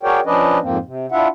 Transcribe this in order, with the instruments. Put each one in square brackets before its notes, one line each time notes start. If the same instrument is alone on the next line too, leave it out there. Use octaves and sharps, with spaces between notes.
[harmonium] F#4 G#4 A#4 C#5 D5 G5
F3 C#4 D4 B4 D5 D#5
F2 G#2 F3 A#3 C4
C3
D4 E4 F4 E5 F#5